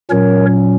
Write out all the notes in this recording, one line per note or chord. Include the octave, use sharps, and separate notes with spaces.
A#2 F#3 C#4 A#4 C#5